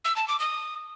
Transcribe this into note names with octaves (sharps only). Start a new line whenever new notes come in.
E6
A5
D6
D#6